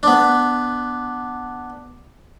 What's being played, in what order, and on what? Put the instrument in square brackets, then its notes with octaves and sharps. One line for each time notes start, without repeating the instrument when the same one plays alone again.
[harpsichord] B3 D4